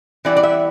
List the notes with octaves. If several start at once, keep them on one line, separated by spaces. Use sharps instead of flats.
E3 G3 B3 E4 D5
D5
E5